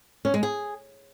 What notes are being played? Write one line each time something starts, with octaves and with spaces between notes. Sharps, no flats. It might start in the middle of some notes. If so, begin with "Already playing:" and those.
C#4
G#3
G#4